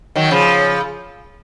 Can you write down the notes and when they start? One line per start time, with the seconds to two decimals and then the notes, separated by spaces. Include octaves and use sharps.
0.16 D#3 F#3
0.31 C#3 F3